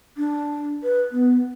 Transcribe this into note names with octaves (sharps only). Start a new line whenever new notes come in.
D4
B4
B3